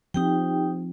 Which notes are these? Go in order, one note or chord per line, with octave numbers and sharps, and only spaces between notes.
F3 C4 D#4 G4 G5